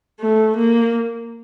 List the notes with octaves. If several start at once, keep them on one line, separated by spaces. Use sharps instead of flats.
A3
A#3